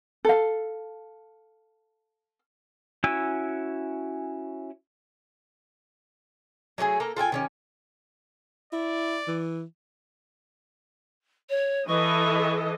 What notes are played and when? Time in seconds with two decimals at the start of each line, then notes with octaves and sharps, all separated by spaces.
0.25 A4 F5
3.04 C#4 E4 F#4 G#5 E6
6.78 F#3 A3 F#4 G#4
7.00 A#3 A4 A#5
7.16 F4 A4 G5 G#5
7.32 D#3 C#4 G4
8.73 E4 D5
9.27 E3
11.49 C#5
11.87 E3 A4 D#5 C#6